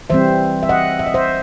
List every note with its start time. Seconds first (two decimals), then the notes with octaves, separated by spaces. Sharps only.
0.10 E3 G3 C4 C5 E5
0.63 E5
0.69 D#5 F#5
0.99 E5
1.06 D#5
1.14 C5 E5